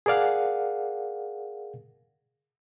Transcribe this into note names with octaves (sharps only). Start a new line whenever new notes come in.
G#4 A#4 D5 F5 F#5